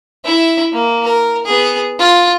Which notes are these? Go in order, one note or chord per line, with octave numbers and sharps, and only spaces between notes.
E4 E5
A#3
A#4
B3 G#4
F4